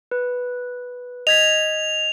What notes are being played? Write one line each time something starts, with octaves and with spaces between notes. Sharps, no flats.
B4
D#5 G#6 B6 F7